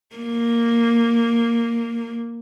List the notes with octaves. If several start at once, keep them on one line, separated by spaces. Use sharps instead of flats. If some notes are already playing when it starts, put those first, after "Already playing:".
A#3